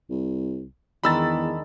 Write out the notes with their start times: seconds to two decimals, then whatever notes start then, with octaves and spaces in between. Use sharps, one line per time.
0.10 C2
1.04 E2 D#3 G#3 D4 B5 E6 A6